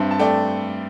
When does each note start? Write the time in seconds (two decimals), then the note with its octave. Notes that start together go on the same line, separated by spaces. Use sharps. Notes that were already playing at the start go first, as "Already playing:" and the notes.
Already playing: G2 C4 E5 A5
0.11 A5
0.19 A3 D5 G5